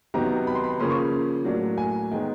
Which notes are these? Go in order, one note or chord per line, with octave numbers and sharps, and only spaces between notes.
C3 D#3 F#3 B3 A#5
B5
C6
B5
C#3 F3 A#3 C#4 C6
C#6
A2 F#3 A#3 D4
G#5
D#3 G#3 B3 G5